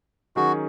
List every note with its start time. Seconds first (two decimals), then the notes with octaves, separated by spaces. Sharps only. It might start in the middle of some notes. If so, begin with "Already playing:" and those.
0.36 D#3 F#3 C#4 F#4 G#4